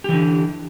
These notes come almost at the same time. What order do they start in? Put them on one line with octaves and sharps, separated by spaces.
G4 E3 D3